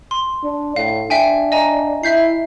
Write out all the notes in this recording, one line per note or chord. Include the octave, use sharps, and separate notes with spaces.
C6
D4
A2 F5
D4 E5 G5 G#5
D#5 G#5 A#5
E4 E5 G6 C7